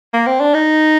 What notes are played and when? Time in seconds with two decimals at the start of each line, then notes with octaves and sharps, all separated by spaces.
0.13 A#3
0.27 C4
0.40 D4
0.54 D#4